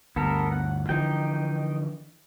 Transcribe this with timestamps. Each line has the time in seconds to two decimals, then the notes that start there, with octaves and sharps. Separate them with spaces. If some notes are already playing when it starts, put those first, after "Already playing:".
0.16 D2 G2 B3 A4 A#4
0.52 F#5
0.89 D3 E3 F3 D#4 G5